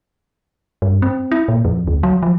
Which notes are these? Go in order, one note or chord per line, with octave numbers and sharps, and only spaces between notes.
G2
C4
E4
A#2
F2
D2
F#3
F3